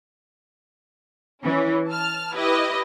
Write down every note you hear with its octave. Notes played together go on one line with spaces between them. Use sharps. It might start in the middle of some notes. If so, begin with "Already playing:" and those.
E3 C#4
A5 F6
E4 G4 B4 D#5